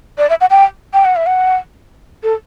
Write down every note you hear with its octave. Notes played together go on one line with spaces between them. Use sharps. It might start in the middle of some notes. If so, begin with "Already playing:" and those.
D5
E5
F#5
G5
G5
F#5
E5
F#5
A4